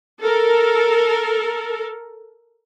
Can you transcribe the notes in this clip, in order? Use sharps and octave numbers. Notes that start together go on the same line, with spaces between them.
A4 A#4